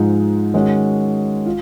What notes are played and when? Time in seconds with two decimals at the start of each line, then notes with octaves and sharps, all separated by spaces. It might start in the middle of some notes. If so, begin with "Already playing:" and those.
Already playing: G#2 F3 G#3 D#4
0.54 D#3 G#3 C#4 F#4
1.46 F4